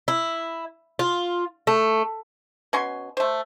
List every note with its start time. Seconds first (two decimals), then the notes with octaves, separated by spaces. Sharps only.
0.08 E4
0.99 F4
1.67 A3
2.73 B2 C#4 G#5 C6
3.17 A3 C5